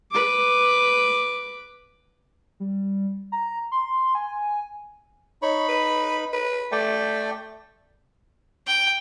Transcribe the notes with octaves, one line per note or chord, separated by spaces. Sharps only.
B4 D6
G3
A#5
C6
G#5
D#4 C#5 B5
B4
B4
A3 D5 G5
G5